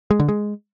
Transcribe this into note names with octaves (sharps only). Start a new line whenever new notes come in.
G#3
D3
G#3